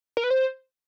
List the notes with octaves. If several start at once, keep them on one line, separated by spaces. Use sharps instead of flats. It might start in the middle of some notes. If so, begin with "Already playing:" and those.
A#4
B4
C5